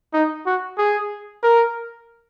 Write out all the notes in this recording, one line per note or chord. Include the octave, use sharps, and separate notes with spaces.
D#4
F#4
G#4
A#4